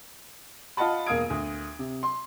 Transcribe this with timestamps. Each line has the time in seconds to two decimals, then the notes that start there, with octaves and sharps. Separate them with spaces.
0.77 F4 D#5 F#5 A5 B5
1.06 E1 A#3 F5 D#6 G#6 D7
1.30 D2
1.79 C3
2.03 C6